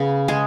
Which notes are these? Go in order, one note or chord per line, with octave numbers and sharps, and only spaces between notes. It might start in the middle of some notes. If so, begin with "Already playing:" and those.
Already playing: C#3 B3
G#3 G#4